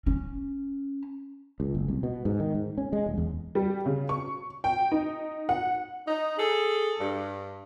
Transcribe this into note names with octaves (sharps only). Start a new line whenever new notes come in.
C#4
C#2
F#1
C2
B2
G#2
D#3
G#2
C#4
G#3
D#1
E2
G3
C#3
C#6
G5
D#4
F#5
D#4
G#4 A4
G2